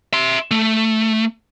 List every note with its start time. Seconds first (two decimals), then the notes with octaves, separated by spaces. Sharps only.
0.13 E5 C6
0.51 A3